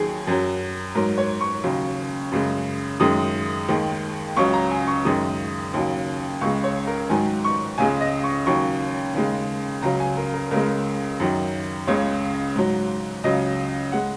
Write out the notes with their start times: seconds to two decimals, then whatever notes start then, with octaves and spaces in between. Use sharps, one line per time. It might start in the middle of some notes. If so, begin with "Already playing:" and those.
Already playing: D#2 D#3 F#3 G#4
0.27 F#2 F#3
0.95 G#2 F#3 A#4
1.18 C#5
1.41 C#6
1.64 D#2 C#3 F#3
2.32 F#2 C#3 G#3
3.00 F#2 D#3 G#3 D#6
3.69 D#2 D#3 G#3
4.37 C#2 C#3 F#3 C#6
4.54 A#5
4.71 G#5
4.87 C#6
5.05 F#2 D#3 G#3 D#6
5.74 D#2 C#3 F#3
6.41 C#2 C#3 G#3 C#6
6.64 C#5
6.87 A#4
7.10 G#2 D#3 F#3 G#5
7.44 C#6
7.78 C#2 C#3 G#3 G#5
8.01 D#5
8.24 C#6
8.46 D#2 C#3 F#3 C#6
9.14 D#2 C#3 G#3
9.82 C#2 C#3 F#3 A#5
10.00 G#5
10.17 A#4
10.34 A#4
10.51 C#2 C#3 G#3 A#4
11.20 F#2 D#3 F#3
11.87 C#2 C#3 G#3 C#5
12.56 G#2 F#3
13.24 C#2 C#3 F#3 D#5
13.92 G#3 F#5